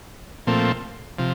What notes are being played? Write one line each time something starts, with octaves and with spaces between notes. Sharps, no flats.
A#2 F3 A3 C4
C3 F3